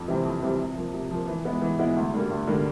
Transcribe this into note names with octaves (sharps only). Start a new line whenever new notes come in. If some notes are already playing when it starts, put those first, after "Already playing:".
Already playing: F2
C3 E3 G3 C4
F2
C3 E3 G3 C4
C3
F3 A#3
C3
F3 A#3
E3
G#3 B3 E4
E3
G#3 B3 E4
D2
D3 G3 A#3
D2
D3 G3 A#3